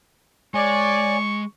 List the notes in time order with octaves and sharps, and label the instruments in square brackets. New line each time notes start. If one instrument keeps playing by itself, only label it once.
[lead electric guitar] G#3 [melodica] C#5 G#5 [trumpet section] D5 [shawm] C#6